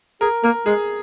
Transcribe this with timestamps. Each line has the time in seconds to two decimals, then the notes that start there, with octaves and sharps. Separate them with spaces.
0.21 G#4 A#4
0.44 A#3 A#4
0.66 G#3 G#4